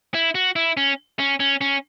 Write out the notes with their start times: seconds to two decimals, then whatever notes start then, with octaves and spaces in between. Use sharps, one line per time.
0.14 E4
0.35 F#4
0.56 E4
0.77 C#4
1.19 C#4
1.40 C#4
1.61 C#4